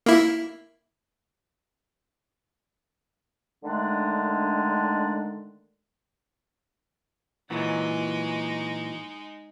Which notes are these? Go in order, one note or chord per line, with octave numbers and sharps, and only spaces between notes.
A#3 E4
D3 D#3 G#3 A3 D4
A#2 E3 F#3 G#3 D#4